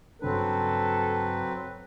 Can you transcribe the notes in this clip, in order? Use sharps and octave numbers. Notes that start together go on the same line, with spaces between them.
G2 C#3 F#3 C4 D4 A4 B4